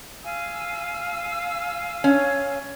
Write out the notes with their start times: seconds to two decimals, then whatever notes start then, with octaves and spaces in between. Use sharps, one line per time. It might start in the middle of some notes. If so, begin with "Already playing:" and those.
0.23 F5 G#5 E6
2.04 C#4